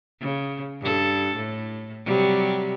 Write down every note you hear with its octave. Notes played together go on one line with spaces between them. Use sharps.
C#3
G2 A4
A2
C3 F#3 G3